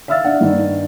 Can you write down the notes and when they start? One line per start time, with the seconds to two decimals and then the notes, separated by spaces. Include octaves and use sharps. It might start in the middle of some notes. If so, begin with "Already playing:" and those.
0.08 E5 F5 E6 F6 A6
0.24 D4 F#5
0.41 G2 D#3 D4